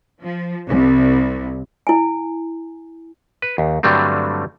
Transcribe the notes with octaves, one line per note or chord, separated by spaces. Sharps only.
F3
C2
E4 G#5
B4
D#2
G2 D3 F#3 G3 A3 C4